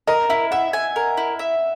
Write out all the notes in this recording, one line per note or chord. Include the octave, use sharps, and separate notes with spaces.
A#4 D#5
E4 E5
E5 F#5
G#5
A#4
E4
E5